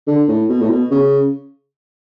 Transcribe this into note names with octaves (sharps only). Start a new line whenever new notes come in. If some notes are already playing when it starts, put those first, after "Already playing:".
D3
A2
B2
A2
B2
C#3